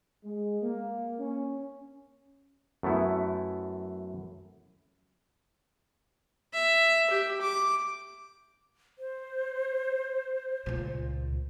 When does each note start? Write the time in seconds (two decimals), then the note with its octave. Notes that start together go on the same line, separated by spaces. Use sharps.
0.24 G#3
0.62 A#3
1.19 C#4
2.83 F#2 A3 B3 E4
6.53 E5
7.10 G4
7.41 D6
8.99 C5
10.66 C#2 A#2